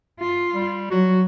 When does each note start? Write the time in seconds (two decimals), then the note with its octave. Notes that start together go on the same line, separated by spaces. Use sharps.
0.20 F4
0.55 G3
0.91 F#3 F#4